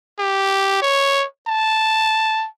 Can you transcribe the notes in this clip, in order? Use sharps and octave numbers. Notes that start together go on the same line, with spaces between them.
G4
C#5
A5